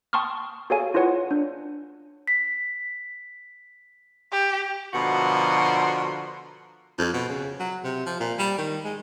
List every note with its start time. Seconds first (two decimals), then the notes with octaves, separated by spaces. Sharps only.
0.13 G5 A5 C6 C#6 D#6 F6
0.70 F#4 G#4 A4 C#5 F5 G#5
0.94 E4 F4 G#4 B4 C#5 F#5
1.31 D4
2.28 B6
4.32 G4
4.94 B2 D3 F3 F#4 A#4 C6
6.98 F2
7.14 B2
7.29 C#3
7.60 F#3
7.84 C3
8.06 F3
8.20 A#2
8.39 G3
8.58 D#3
8.84 G#3